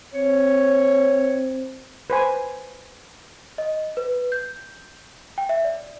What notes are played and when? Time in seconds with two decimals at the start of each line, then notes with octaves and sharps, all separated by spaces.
0.14 C4 C#5
2.10 B4 C5 G#5
3.58 D#5
3.97 B4
4.32 G6
5.38 G5
5.49 E5
5.64 D5